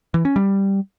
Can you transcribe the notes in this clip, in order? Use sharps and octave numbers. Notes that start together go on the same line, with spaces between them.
E3
C#4
G3